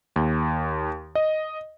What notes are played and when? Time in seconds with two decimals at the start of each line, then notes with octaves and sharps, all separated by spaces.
0.16 D#2
1.15 D#5